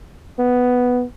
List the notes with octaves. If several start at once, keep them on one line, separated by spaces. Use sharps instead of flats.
B3